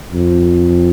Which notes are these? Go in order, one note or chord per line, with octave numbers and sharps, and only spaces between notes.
F2